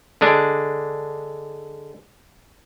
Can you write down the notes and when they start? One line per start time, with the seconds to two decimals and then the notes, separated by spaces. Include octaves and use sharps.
0.21 D3 G#3 D4